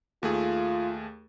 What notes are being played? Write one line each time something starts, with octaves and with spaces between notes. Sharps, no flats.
D#2 A3 F4 G#4